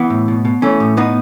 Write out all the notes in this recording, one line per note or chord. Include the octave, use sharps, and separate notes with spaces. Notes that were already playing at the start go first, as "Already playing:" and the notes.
Already playing: E3 B3
A2
B2
B2
E3 A3 C#4
A2
B2 B3 D#4